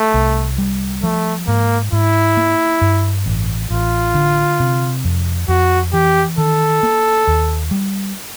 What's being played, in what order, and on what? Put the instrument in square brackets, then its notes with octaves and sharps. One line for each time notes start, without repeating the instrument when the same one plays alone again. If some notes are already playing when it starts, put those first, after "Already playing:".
Already playing: [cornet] A3
[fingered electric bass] C2
G3
[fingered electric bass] F3 [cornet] A3
[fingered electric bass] G#2 [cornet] A#3
[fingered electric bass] G#2 [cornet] E4
[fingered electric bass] A#3
G2
A1
[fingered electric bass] A1 [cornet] F4
[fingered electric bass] D3
C3
F2
[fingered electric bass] F2 [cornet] F#4
[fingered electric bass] E3 [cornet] G4
[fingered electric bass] D#3 [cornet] A4
[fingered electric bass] A#3
D#2
G3